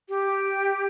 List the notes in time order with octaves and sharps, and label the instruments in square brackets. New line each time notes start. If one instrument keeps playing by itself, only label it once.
[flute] G4